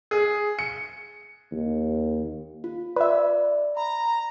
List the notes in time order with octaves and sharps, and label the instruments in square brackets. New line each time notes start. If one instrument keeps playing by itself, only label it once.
[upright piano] G#4
C#7
[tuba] D#2
[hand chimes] F4
[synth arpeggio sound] B4 E5 [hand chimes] D5
[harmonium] A#5 [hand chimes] B5